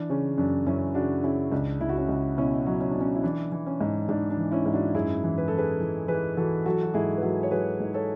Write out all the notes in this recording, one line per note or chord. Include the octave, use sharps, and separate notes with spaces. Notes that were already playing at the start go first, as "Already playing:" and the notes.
Already playing: E3 D4
C#3 C#4
F#2 D4
F#2 C#4 E4
C#3 D4 F#4
C#3 C#4 E4
C#2 D4
C#2 E4
F#4
C#4 E4
C#2
B2 C#4 E4
F#3
C#4
B2 D4
C#4
E4
E3 D4
E3
C#4
G#2
G#2 D4
D4
E3
C#4 E4
G#2
D4 F#4
F#2 E4 G#4
E3
B4
E3 A4
G#4 B4
E3
E3 G#4 B4
E3 F#4 A4
F#3 F#4 A4
F#4
G#2 E4 G#4
B4
F#3 F#4 A4
C#5
F#3 G#4 B4
G#2
A4 C#5